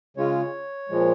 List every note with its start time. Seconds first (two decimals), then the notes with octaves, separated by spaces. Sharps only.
0.17 C#3 G#3 C#4 F4 C#5
0.89 A#2 F3 G#3